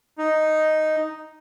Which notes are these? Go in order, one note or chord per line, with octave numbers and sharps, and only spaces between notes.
D#4